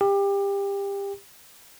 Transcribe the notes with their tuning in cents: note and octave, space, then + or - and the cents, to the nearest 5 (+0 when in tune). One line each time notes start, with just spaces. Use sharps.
G4 +25